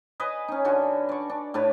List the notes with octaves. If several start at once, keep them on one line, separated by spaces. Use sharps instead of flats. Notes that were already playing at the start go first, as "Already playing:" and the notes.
B4 D#5 G#5
C#4 D#4
D3 C#4 F#4
D5 C#6
D4
A2 D4 B4 C#5